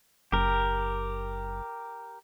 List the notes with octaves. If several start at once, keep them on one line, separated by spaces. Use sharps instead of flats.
F#1 G4 A#4